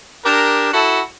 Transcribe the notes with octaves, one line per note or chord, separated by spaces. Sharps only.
D4 G4 A#4
E4 F#4 A4